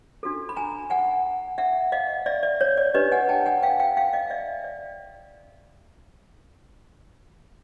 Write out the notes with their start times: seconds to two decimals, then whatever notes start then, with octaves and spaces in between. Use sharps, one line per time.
0.23 D4 F#4 A4
0.49 B5
0.56 G#5 A#5
0.90 F#5 G#5
1.58 E5 F#5
1.92 D#5 F5
2.26 D5 E5
2.43 D5
2.61 C#5
2.77 D5
2.94 D4 G4 B4 C#5 D#5
3.12 F#5 G#5
3.29 G5 A5
3.46 F#5 G#5
3.63 F5 G5
3.80 F5 G5
3.97 F5 G5
4.13 D#5 F5
4.30 D5 E5
4.64 D5